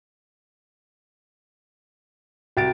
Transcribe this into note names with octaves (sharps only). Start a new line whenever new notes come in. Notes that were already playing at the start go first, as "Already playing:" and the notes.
C2 F#4 G5 A6 D7